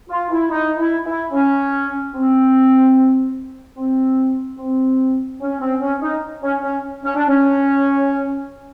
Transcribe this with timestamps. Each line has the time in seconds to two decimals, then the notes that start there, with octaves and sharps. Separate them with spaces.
0.10 F4
0.30 E4
0.51 D#4
0.78 E4
1.05 E4
1.32 C#4
2.14 C4
3.77 C4
4.59 C4
5.41 C#4
5.61 C4
5.81 C#4
6.01 D#4
6.42 C#4
6.62 C#4
7.04 C#4
7.15 D4
7.28 C#4